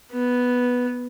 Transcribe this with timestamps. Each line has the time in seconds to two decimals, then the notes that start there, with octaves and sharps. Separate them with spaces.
0.12 B3